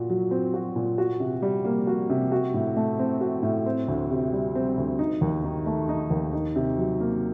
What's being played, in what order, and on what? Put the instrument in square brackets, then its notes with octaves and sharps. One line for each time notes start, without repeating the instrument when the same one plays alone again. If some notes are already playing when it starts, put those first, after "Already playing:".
Already playing: [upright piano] A#2 F#4
F#3
C4
F#4
A#2
F#4
C3
G3
A#3
F#4
C3
F#4
A2
A3
C4
F#4
A2
C4
D2
C3
G3
C4
D2
D#4
D#2
D#3
A3
D#4
D#2
D#4
C3
F#3
A#3